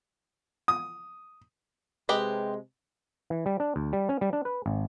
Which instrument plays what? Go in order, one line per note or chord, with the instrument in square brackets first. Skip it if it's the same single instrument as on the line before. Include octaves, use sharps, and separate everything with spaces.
[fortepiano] D#6
[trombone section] C3 G#3 [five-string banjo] G4 B4 D#5
[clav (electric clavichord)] E3
G3
D4
D2
G3
C#4
G3
D4
B4
G#1